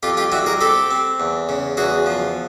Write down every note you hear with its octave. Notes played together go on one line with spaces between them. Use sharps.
F2 F4 G4
F4 G4
G3 E4 F#4
G#4 A#4
C4 G4 A4
C4
E2
C#3
E2 F#4 G#4
F3